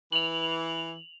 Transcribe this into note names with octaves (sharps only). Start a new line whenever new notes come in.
E3 F7 F#7